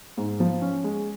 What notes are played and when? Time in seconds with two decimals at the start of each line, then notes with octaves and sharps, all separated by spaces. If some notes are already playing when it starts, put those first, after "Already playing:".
0.17 G#2
0.40 F3
0.62 C#4
0.84 G#3